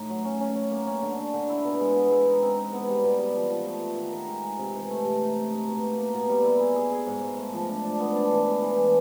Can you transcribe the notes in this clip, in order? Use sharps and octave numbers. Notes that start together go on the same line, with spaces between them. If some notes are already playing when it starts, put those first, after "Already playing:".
Already playing: A2 D#4
F#3
C#4
C#4
C#4
A#3
C#4
D3
D3
D3
E4
B2
G#3
B3
G#3
D#4
C4
D#4
B3
G3
B2
G3
F3
F3
A3
A3
D#3
D#3
G#3
G#3
C3
E3
A3
C3
D#4
D#4
D#4
B2
A#3
A#3
B2
G3
E4
G#4
G#4
G#4
G#2
G#2
A3
F3
D4
D4
B3
D4
E3
E3
E3
G#3